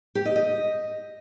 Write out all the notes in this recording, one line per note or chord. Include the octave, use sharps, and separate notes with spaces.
G4
D#5
D#5